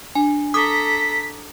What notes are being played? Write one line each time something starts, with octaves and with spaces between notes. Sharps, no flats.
D4 G#5
A4 A#5 D6 D#6 B6